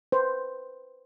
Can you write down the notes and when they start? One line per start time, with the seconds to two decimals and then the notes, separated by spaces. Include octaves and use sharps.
0.12 B4 C5